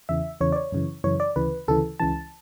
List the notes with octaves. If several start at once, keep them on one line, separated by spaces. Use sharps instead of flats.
E2 C#3 E3 E5
E2 C#3 E3 C#5
D5
C#5
F#2 C#3 E3
F#2 C#3 E3 C#5
D5
D2 C#3 E3 B4
D2 C#3 E3 A4
C#2 C#3 E3 A5